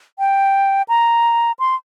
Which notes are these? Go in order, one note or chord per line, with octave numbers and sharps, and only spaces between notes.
G5
A#5
C6